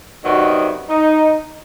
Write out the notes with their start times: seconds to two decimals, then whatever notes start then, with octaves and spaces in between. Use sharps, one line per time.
0.24 C3 D#3 F#3 B3 D4 F#4
0.89 D#4